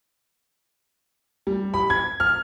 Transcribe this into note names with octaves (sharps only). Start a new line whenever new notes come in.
G3
B5
G#6
F6